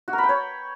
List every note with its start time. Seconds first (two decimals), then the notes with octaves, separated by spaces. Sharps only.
0.08 F#4
0.13 A#4
0.18 B5
0.24 G5
0.29 C#5